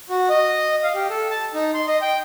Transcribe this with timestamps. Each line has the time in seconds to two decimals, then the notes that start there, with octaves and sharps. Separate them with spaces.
0.10 F#4
0.29 D#5
0.83 F5
0.95 G4
1.10 A4
1.30 A5
1.54 D#4
1.74 C6
1.87 D#5
2.01 G5